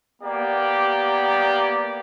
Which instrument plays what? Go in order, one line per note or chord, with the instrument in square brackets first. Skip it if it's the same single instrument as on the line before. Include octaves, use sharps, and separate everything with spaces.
[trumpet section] A#3 B3 G4 D5